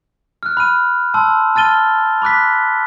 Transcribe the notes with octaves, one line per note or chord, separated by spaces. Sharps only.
F6 F#6
B5 F6 D#7
A5 C6 E6
A5 F6 A6 D#7 G7
B5 D6 F#6 B6